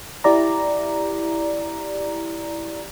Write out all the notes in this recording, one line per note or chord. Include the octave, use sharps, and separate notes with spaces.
E4 G4 D5 A#5